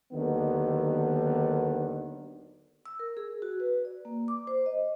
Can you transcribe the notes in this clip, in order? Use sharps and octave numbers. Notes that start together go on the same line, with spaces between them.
D#2 D3 D#3 F#3 B3
E6
A#4
G#4
F#4
B4
D5
A#3
D6
C5
D#5